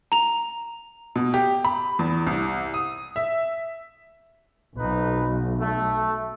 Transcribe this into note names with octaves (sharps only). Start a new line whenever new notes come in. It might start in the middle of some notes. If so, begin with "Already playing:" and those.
A#5 F7
B2
G4
B5
E2
C2
D#6
E5
B1 F2 D#4 B4
A3